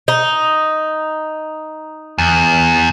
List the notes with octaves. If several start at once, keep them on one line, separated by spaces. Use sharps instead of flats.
D#4
E2